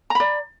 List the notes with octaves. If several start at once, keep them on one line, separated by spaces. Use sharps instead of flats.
D5 A#5 B5